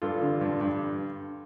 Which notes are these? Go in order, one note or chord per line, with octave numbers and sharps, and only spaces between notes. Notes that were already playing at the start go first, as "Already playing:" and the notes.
G2 F4 A4
D3
G2
G2